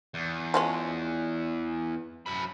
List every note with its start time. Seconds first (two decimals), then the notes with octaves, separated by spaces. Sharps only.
0.14 E2
0.54 F3 G#3 C#4
2.26 F#2 B5